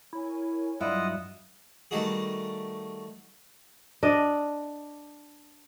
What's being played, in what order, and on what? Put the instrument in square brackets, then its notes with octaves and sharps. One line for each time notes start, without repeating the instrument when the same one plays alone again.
[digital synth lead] E4 [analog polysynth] A#4 C#5 G#5
[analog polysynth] G2 F#3 [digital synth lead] G3 [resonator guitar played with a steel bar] E4 [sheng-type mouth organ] F4 D#5 F#5
[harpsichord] D#3 G3 A3 D#4 F#4 G#4
[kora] D4 D#5